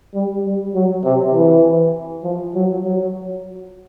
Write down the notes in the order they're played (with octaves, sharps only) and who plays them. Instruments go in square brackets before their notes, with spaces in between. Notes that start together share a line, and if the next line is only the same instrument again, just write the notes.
[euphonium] G3
G3
F#3
C3
E3
F3
F#3
F#3